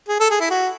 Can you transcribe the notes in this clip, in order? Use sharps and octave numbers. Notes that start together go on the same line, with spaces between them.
G#4
A4
G#4
E4
F#4